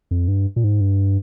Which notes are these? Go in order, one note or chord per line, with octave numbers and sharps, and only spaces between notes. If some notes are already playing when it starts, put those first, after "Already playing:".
F2
G2
A#2
G#2
G2